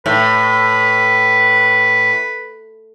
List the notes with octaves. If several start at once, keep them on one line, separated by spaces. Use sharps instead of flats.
A2 B4